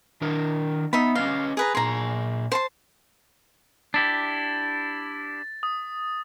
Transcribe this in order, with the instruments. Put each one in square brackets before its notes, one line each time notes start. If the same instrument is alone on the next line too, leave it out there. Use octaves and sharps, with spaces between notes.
[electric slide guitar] D#3 D4 A#4
[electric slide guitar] B3 [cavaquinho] D#4 E5 B5
[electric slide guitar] C#4 B4 D#5 [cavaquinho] F5
[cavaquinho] G#4 B4 A#5
[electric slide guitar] A#2 G#4 [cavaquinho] A#5 C6
[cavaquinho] C5 A5 C6
[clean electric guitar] D4 E4 G4 [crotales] A6
[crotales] D#6